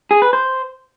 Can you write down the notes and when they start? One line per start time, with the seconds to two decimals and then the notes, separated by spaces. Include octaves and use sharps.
0.11 G#4
0.22 B4
0.33 C5